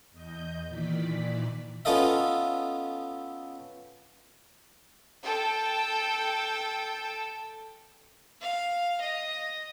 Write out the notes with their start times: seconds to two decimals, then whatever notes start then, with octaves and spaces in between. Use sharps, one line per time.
0.11 E2 D#5 G6
0.68 A#2 D#3 E3 D5 B6
1.85 B3 C#4 F4 A4 D#5 E5
5.24 A4 G5
8.41 F5
9.01 D#5